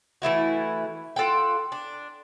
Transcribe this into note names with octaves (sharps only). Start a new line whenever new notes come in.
E3 A3 E4 F#4
F4 A4 F#5 G5
D4